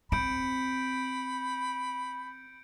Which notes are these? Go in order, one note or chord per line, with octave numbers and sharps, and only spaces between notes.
C4 B5 G6 C#7 D7